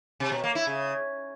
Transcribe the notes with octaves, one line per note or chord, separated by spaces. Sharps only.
C3
B2
A#3
E4
C#3